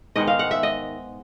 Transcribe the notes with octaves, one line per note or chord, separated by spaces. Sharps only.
G#2 D#3 G#3 B3 D#5
F5
F#5
E5
D#5